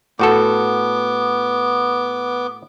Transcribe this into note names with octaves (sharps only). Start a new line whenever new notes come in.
A2 B3 F#4 A4 D6